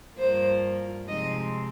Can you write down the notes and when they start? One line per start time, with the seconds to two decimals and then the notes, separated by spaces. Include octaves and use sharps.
0.18 G2 F3 A#3 C5
1.07 C3 F3 G#3 C4 D#4 D#5